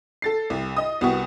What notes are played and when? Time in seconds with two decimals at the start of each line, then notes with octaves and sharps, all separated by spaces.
0.22 A4 A6 C7
0.50 C2
0.77 D#5 D#6
1.01 C2 B3 F#4 C#6